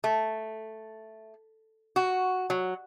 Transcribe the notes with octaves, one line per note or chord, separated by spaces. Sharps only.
A3
F#4
F#3